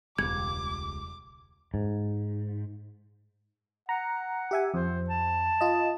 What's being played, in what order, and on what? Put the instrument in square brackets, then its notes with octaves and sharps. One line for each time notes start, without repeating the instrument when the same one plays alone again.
[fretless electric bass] E1 [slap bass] C#2 G3 [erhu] D6 [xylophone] G#6
[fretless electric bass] G#2
[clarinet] F#5 [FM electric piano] A#5
[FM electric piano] G4 E5 G#5
[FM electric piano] F2 [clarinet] C5
[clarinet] A5
[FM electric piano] F4 D#5